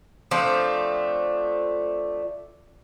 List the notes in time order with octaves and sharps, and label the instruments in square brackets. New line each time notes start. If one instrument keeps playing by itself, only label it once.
[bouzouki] F3 A3 C4 D4